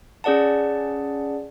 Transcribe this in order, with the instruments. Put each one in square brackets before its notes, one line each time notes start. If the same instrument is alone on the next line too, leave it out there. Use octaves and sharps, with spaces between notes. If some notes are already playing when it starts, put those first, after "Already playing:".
[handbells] C#4 G#4 D5 F#5 A5